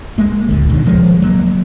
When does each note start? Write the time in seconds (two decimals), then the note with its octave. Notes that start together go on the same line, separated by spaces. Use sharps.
0.18 G#3 A#3
0.48 D1 G#1 D3
0.69 D#2 B2 D3 D#3
0.86 F3 G#3
1.22 F#3 A#3